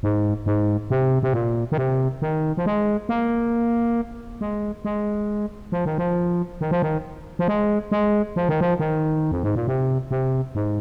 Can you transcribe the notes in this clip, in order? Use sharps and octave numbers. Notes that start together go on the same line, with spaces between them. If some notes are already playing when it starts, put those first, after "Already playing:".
G#2
G#2
C3
C3
A#2
D#3
C3
D#3
F3
G#3
A#3
G#3
G#3
F3
D#3
F3
D#3
F3
D#3
F3
G#3
G#3
F3
D#3
F3
D#3
F2
G#2
A#2
C3
C3
G#2